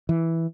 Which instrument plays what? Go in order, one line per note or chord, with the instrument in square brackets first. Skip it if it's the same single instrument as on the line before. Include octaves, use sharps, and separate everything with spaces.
[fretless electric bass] E3